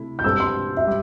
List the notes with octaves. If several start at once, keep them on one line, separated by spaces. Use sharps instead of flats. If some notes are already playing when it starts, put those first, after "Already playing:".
Already playing: C3 A3 E4
G6
G2 G3 C4 A4 C5 E6
C6
E5
G3